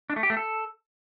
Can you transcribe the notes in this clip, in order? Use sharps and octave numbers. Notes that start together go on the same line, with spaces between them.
D4
A3
G4
A3
A4